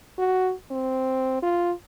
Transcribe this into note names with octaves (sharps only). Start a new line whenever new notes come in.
F#4
C4
F4